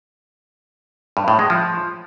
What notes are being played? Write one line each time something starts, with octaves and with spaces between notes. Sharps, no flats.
G2
A2
G#3
F3